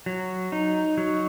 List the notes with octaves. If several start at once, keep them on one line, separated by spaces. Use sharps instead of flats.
F#3
D#4
F#3